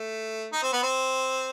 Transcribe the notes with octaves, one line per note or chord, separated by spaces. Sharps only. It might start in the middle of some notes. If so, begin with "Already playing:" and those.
Already playing: A3
D#4
C4
B3
C4